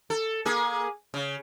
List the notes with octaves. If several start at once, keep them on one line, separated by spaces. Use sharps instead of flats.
A4
A#3 G#4
C#3